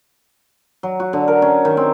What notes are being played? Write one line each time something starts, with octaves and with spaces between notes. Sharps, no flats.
F#3
F#4
D3
A#4
C#4
D#3
C4